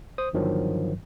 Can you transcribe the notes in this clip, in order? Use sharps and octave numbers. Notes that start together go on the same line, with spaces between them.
C5 D#6
G1 G2 D#3 F3 F#3